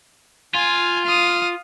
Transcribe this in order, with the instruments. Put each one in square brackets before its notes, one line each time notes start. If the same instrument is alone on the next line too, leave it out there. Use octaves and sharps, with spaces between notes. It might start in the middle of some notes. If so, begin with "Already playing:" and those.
[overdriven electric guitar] F4 [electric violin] G#5
[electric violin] F5 D#6